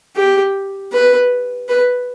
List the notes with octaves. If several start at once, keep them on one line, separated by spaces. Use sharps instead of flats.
G4
B4
B4